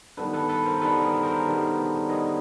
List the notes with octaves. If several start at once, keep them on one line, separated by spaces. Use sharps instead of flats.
D#3 G3 B3 D4 A4 B4
A4 B4
A4 B4
A#4 C5
D#3 G3 B3 D4 A4 B4
G#4 A#4
A#4 C5
D#3 G3 B3 D4
D#3 G3 B3 D4 C#5 D#5